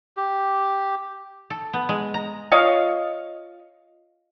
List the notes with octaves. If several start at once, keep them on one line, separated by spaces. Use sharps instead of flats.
G4
A4
B3
G#3
A#5
F4 C#5 D#5 F5